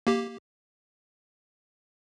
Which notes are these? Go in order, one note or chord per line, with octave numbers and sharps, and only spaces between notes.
A#3 G4